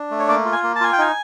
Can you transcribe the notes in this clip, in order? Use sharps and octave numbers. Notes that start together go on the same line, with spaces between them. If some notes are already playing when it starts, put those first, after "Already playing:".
Already playing: D4
A3
C#5
A#3 D5
F4
G#5
A#3
A5
F4 G#5
G5
D#4 G#5